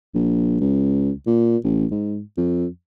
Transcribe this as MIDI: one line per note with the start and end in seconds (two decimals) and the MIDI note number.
0.15 0.59 34
0.60 1.11 37
1.27 1.58 46
1.64 1.86 33
1.91 2.20 44
2.38 2.66 41